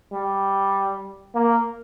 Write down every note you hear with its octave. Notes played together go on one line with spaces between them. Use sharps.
G3
A#3